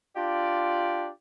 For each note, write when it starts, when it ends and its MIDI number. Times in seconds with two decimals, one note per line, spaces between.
0.16 1.09 62
0.16 1.09 65
0.16 1.09 67
0.16 1.09 74